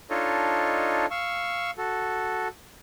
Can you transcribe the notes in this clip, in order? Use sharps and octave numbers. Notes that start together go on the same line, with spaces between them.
D4 D#4 F4 A4 C#5 D#5
F5 C#6 E6
F#4 A4